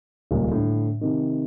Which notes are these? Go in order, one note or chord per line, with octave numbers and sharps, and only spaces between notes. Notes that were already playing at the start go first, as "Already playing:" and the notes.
D#1 C#2 A#2
A2 D3
C3 D#3